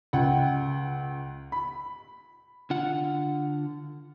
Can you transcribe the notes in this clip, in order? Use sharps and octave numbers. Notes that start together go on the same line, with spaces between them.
C#2 F#5 G5
B5
D3 F4 F#5